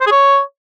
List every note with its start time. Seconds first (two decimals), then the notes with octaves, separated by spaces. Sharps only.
0.01 C5
0.06 G#4
0.12 C#5